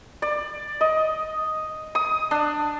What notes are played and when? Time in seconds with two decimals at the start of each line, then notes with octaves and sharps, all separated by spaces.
0.22 D5
0.81 D#5
1.95 D#6
2.31 D4